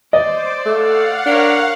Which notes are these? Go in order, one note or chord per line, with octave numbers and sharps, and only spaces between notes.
C5 D5 D#5 D6
A3 F5 F#5
D4 A#4 C#5